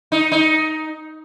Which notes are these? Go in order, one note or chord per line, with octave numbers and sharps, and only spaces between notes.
D#4
D#4